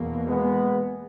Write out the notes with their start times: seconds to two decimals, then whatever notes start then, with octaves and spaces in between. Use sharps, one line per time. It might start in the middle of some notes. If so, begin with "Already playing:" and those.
Already playing: E2 B2 A#3
0.27 G#3 B3